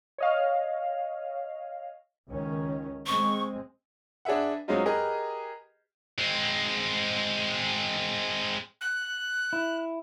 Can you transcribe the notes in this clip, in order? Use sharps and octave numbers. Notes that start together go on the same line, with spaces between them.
C#5 D#5 F5
C#2 D#3 C#4
G#3 C4 C#6
D4 G#4 B4 E5 F#5
F#3 G#3 C4 C#4 D#4 F4
G4 G#4 A#4 B4 D#5
G#3 C4
F#6
E4